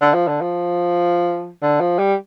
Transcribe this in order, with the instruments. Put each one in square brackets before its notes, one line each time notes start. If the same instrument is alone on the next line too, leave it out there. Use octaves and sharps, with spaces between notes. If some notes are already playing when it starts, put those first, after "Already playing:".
[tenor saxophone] D3
F3
D3
F3
D3
F3
G3